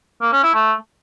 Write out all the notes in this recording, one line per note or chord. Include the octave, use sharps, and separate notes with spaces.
A#3
C#4
E4
A3